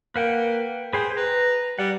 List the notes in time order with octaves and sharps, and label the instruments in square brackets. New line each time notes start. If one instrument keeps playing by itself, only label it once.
[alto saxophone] A#3 [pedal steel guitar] B4 F#5 G5
[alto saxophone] G#4 [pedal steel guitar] B4 C5 G5
[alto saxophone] B4 [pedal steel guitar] A#5
[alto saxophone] G3 [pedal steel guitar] F#5